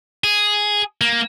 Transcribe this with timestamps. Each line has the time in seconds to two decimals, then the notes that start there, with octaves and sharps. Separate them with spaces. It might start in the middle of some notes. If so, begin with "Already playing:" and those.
0.24 G#4
1.01 A#3